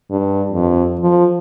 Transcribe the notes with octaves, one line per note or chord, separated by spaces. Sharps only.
G2
F2
F3